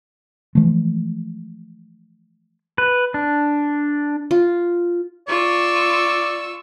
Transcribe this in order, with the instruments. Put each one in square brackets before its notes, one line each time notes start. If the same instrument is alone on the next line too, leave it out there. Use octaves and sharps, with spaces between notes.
[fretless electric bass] E3 F3 G#3 A3
[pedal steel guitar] B4
D4
[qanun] F4
[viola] F4 [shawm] D5 [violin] C#6 E6